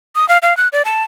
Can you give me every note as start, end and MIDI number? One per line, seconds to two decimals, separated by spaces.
0.15 0.27 87
0.29 0.38 77
0.42 0.56 77
0.57 0.68 90
0.73 0.82 74
0.85 1.03 81